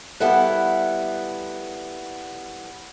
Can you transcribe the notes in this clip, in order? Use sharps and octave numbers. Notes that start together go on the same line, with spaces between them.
G3 B3 E4 A4 F#5